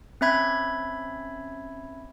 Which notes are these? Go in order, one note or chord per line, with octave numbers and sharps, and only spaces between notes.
C4 C#4 E5 B5 G#6